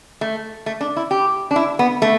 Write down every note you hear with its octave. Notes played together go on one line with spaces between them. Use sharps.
A3
A3
D4
E4
G4
D4
E4
B3
A3